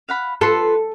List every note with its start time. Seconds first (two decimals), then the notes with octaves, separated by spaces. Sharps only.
0.09 F5 F#5 B5
0.41 F4 A4 B4 C6